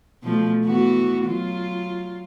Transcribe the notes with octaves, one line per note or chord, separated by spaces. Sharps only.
B2 F3 A3
E3 B3 F#4
F#3 F4